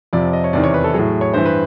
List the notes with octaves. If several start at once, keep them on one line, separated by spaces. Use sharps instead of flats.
F2 C3 F3 D5
D#5
C#5
E2 C3 D#3 D5
C#5
B4
A4
A2 F#3 G#4
C#5
G2 E3 C5
B4